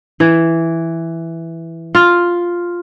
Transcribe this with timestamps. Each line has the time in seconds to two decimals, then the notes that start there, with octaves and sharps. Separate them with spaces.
0.20 E3
1.95 F4